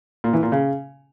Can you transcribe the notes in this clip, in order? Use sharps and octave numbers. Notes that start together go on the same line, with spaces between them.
A#2
E3
A#2
C#3